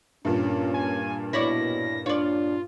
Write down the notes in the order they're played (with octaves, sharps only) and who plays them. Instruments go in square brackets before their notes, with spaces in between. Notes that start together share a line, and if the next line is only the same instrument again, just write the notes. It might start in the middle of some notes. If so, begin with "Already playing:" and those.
[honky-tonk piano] G2 A#2 [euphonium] C#4
[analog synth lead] G#5
[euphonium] B2 [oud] E4 C#5 D5 [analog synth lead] A#6
[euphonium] D4 [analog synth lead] F4 [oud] C#5 D5